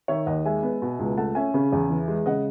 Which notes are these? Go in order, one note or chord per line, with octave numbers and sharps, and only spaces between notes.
D#3 C#5 E5
D#2 D#5 F#5
G#3 E5 G#5
B3
B2
C#2
A3 F#5 A5
C#4 E5 G#5
C#3
E2
E3
G#3
C#3 D#5 F#5